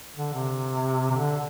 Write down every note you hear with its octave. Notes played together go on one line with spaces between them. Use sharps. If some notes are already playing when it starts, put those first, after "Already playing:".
D3
C3
C3
D3